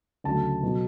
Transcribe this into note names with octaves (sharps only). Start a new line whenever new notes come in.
D2 C#3 F#3 A3 A5
B2 F#3 B3